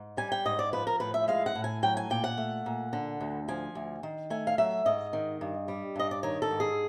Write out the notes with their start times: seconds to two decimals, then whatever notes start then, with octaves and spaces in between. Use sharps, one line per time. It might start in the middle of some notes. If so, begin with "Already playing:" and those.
Already playing: G#2
0.17 G3 G#5
0.32 G5
0.45 G#2 D#5
0.59 D5
0.73 F3 B4
0.87 A#4
1.00 A2 B4
1.14 E5
1.28 G#3 F5
1.46 F#5
1.55 A2
1.64 G#5
1.82 F#3 G5
1.97 G#5
2.10 A#2 G5
2.24 F#5
2.38 A3
2.66 A#2
2.93 D3
3.20 D2
3.48 F3 G#5
3.75 D2
4.03 D#3
4.30 A3 G#5
4.47 F5
4.58 F#3 E5
4.86 G#2 D#5
5.13 D#3
5.41 G2
5.68 G3
5.96 G2 D#5
6.11 D5
6.23 D#3 C#5
6.42 A4
6.51 G#2
6.60 G#4